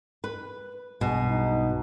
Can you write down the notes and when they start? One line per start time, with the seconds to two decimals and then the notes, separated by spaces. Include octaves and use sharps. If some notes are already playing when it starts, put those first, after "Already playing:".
0.24 B4
1.01 B1 G2 B2 G#3
1.30 D#4